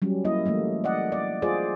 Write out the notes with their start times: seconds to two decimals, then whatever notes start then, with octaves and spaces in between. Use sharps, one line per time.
0.02 F#3 G3 C#4
0.25 A#3 E4 D#5
0.46 E3 G3 A3 A#3
0.84 D5 D#5 F#5
1.12 D5
1.42 F4 G#4 C5 D5